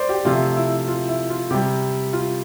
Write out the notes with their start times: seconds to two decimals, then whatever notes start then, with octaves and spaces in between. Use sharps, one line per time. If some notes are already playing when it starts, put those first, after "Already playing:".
Already playing: C5 D5
0.09 G4
0.25 C3 F3 A3 F4
0.57 E4
0.88 F4
1.09 E4
1.30 F4
1.51 C3 G3 G4
2.13 F4